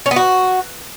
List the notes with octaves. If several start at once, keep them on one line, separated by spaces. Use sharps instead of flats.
C#4
B3
F#4